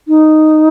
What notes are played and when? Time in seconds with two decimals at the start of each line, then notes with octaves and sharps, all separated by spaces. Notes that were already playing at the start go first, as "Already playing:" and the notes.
0.08 D#4